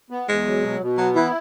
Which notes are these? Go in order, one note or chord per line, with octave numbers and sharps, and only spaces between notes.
B3
E2 G#3
F#3
B2
B2
F#3 B3
E3 E4